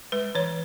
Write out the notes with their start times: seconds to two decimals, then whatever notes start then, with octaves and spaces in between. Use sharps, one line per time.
0.12 G#3 B4
0.35 E3 C#5